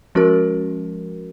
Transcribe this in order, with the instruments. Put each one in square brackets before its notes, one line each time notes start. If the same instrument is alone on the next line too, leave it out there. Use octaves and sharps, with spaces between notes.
[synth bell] F3 G#3 C#4 F#4 A#4